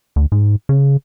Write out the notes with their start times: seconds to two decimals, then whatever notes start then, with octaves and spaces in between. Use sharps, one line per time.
0.16 D2
0.32 G#2
0.69 C#3